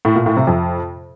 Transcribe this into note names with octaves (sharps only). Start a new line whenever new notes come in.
A2
A#2
A2
C3
F2